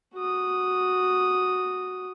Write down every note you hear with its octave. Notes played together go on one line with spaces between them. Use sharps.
F#4 D#6